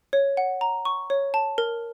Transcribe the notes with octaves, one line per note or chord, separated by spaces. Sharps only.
C#5
F#5
A#5
C#6
C#5
A5
A#4